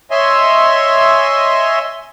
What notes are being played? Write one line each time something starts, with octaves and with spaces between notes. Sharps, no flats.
C#5 D#5 E5 G#5 C6